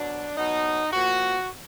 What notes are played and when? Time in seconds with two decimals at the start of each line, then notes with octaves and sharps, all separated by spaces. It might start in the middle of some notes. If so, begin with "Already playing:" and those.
Already playing: B2 F#3 D4
0.36 B2 F#3 D#4
0.91 A#2 F3 F#4